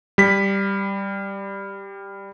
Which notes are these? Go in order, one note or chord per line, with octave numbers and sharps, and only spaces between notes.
G3 B6